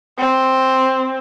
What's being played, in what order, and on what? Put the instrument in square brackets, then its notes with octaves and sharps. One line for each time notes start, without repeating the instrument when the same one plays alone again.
[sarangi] C4